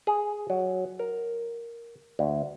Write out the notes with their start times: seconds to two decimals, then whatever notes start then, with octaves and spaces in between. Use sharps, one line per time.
0.07 G#4
0.50 F#3
0.99 A#4
2.19 D2